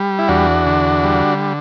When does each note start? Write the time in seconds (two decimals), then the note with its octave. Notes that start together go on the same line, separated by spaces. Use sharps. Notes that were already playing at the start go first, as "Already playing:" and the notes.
Already playing: G3
0.19 E4
0.28 E2 D4 F#4
0.67 D3
1.04 G3